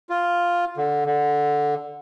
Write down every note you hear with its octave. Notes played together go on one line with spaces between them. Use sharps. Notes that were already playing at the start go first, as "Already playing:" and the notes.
F4
D3
D3